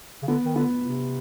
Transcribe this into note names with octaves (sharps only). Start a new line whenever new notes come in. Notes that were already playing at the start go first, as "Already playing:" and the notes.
C#3
D3 B3
D#3
D3 B3
C3